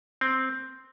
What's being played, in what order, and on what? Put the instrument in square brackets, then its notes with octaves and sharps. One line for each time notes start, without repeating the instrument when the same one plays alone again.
[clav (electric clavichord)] C4